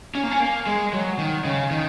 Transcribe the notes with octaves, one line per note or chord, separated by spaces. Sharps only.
C#4
A#3
C#4
A#3
G#3
F#3
D#3
C#3
D#3